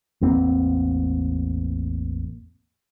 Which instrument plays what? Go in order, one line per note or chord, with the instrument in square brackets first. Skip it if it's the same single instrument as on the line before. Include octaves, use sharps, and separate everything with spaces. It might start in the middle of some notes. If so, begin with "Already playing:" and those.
[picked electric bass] A1 E2 A#3 C4